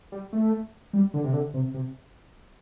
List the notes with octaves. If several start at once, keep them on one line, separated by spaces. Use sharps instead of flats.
G3
A3
G3
D3
C3
D3
C3
C3